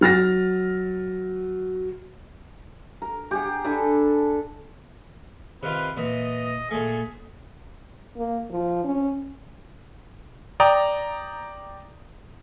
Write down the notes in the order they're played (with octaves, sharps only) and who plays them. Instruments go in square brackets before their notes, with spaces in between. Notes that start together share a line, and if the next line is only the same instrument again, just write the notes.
[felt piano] F#3 F6 A6 A#6
[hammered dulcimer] A#4
G4 G#4 F#5
D4 A4 G#5 B5
[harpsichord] C3 D#3 F4 [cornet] B4
[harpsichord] A#2 E3 [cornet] D#5
[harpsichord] A#2 A3 [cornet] G#4
[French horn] A#3
F3
C#4
[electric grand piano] D5 G5 A#5 D#6